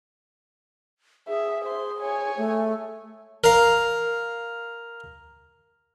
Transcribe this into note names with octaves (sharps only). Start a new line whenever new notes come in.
G#4 E5
C5 C6
C#5 G#5
A3
A#4 F5